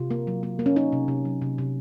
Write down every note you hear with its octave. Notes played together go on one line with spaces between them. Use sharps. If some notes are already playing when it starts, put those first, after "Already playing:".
Already playing: C3 F4
A#3
F#3
A#3
A#3
C#4
A#3 D#4
C3
C3
F#3
C3
C3